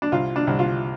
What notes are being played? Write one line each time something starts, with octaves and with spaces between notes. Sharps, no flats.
D4
C2 F4
D4
C2
F4